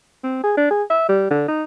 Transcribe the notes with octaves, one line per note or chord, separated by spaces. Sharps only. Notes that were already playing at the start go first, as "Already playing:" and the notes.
C4
G#4
D4
G#4
E5
G3
D3
D#4